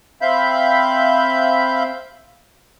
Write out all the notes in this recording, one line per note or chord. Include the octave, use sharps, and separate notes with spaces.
C4 E5 F5 B5 G6